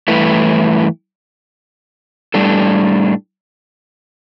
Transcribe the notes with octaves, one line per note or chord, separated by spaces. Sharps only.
G2 E3 A3 E4 B4
A2 G3 D4 A4